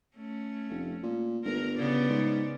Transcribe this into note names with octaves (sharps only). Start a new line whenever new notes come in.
A3 C#4
F1
A#2
G1 A#4
C#3 B3 D5
G#2